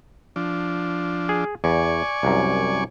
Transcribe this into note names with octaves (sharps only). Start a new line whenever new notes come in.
F3 D4
G#4
E2 D5 G#5 C#6
C2 F#2